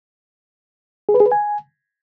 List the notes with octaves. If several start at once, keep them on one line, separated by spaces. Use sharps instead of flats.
G#4
B4
G#4
B4
G#5